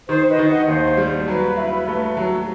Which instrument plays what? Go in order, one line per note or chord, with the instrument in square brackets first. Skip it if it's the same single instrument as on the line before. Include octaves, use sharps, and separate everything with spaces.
[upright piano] D#3 [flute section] C5
[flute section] B4 D#5
[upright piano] D#3
[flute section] D#5 F#5
[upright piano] D#2 [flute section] C5
[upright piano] G3
[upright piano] F#3 [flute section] B4
[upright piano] E4
A3
F#3